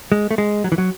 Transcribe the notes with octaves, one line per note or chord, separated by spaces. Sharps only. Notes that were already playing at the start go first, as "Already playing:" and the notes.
G#3
A3
G#3
F#3
E3
F#3